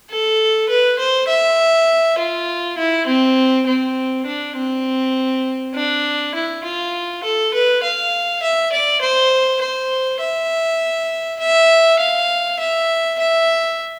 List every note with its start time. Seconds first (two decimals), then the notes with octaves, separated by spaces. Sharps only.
0.10 A4
0.69 B4
0.99 C5
1.28 E5
2.18 F4
2.78 E4
3.07 C4
3.67 C4
4.26 D4
4.56 C4
5.75 D4
6.35 E4
6.64 F4
7.24 A4
7.54 B4
7.83 F5
8.42 E5
8.72 D5
9.01 C5
9.61 C5
10.20 E5
11.39 E5
11.99 F5
12.59 E5
13.19 E5